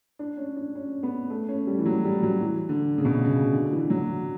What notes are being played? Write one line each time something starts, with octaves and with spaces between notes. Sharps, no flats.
D4
C#4
D4
C#4
B3
A3
C#4
G3
E3
F#3
G3
F#3
E3
D3
C#3
B2
C#3
C#3
D3
E3
F#3